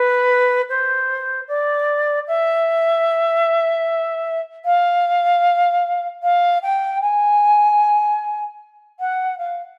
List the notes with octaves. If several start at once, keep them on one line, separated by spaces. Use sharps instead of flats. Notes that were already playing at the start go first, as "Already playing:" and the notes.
Already playing: B4
C5
D5
E5
F5
F5
G5
G#5
F#5
F5